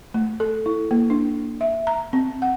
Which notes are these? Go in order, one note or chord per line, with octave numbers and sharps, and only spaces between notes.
A3
A4
E4
A#3
D4
E5
A#5
C4
F#5